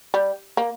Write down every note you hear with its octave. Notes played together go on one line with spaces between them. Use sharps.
G3
A#3